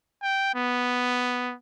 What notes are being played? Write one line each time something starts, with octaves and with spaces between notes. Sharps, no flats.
G5
B3